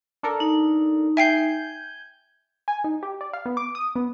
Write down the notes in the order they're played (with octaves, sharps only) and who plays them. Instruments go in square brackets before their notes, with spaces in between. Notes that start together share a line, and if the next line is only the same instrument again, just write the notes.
[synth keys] D4 A4 A#4
[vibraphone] D#4
[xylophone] E5 G5 C7 [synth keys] G#5 G6
[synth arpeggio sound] G#5
D#4
G4
D5
F5
B3
D6
D#6
B3